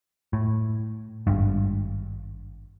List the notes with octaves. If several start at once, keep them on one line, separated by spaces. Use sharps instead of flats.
A2
G#1 G2